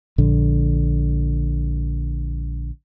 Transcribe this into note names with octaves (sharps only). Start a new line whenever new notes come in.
A#1 D3